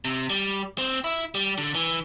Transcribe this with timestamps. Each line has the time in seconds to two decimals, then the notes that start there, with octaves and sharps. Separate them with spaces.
0.05 C3
0.30 G3
0.78 C4
1.04 E4
1.35 G3
1.58 D3
1.75 E3